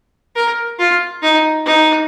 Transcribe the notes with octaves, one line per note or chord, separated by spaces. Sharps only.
A#4
F4
D#4
D#4